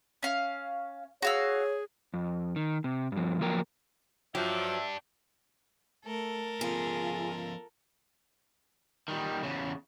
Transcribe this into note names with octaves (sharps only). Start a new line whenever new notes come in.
C#4 F5
F#4 G#4 C#5 F5 E6
F2
D#3
C3
G2 F3
F3 F#3 A#3 A#4 G5
F3 F#3 D4 G4 E5
A3 A4 A#4
F3 B3 C#4 F4 G#4
D#3 G3
E2 C#3